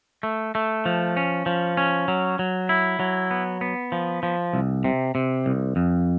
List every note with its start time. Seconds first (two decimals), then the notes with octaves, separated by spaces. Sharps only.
0.23 A3
0.55 A3
0.86 F3
1.17 C#4
1.46 F3
1.77 C#4
2.08 F#3
2.39 F#3
2.69 E4
3.00 F#3
3.31 B3
3.61 B3
3.92 F3
4.23 F3
4.53 C2
4.84 C3
5.15 C3
5.46 C2
5.76 F2